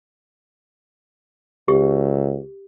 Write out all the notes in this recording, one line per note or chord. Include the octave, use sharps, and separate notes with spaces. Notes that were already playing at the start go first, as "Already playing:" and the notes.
C#2 G4